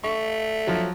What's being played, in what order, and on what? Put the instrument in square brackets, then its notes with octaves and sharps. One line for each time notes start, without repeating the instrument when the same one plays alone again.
[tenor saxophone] A3 [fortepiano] C#6
[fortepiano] F3 F#3